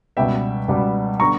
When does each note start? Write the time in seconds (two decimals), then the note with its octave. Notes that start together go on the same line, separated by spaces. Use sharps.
0.17 C#2 B2 G3 B3 E5 G5
0.68 C#2 B2 G3 B3
1.20 D3 G3 B3 A#5 C#6